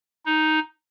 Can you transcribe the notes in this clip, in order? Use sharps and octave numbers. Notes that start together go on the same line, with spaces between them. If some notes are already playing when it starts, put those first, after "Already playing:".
D#4